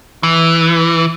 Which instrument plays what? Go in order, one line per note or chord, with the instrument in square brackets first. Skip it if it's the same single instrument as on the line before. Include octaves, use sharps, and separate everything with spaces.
[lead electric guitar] E3